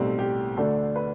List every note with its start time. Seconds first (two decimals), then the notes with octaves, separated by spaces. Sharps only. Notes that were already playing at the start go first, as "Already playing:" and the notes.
Already playing: B1 A2 G3 C4 A4
0.19 G4
0.57 D2 D3 A3 D4 A4
0.96 B4